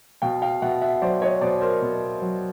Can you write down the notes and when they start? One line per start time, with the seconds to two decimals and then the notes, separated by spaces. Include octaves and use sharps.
0.22 B2 F5 G5
0.42 F5 G5
0.62 B2 E5 F#5
0.82 E5 F#5
1.02 F#3 C5 D5
1.22 C#5 D#5
1.41 B2 C5 D5
1.61 A#4 C5
1.82 B2
2.22 F#3